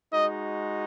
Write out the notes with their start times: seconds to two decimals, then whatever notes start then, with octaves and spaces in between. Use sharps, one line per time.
0.12 G#3 D#4 F#4 D#5